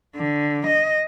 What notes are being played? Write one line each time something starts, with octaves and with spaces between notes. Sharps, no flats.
D3
D#5